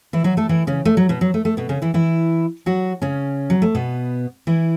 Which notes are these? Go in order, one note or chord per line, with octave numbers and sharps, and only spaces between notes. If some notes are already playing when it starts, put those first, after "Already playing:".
E3 E4
F#3 F#4
A3 A4
E3 E4
C#3 C#4
A3
F#3
B2 B3
F#3
A3
A3
B2 B3
C#3 C#4
E3 E4
E3 E4
F#3 F#4
C#3 C#4
F#3
A3
B2 B3
E3 E4